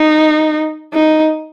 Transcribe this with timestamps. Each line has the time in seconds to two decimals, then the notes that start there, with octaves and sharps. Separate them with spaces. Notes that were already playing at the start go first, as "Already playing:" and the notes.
Already playing: D#4
0.94 D#4